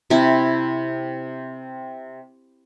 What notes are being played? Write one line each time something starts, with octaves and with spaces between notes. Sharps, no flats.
C3 E4